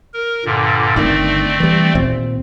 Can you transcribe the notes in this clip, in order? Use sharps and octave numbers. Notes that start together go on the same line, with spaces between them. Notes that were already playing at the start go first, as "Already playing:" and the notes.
A#4
G2 A#2 D3
G1 D3 D#3 A3 C4 D5
E3 G3
D#2 A#2 C4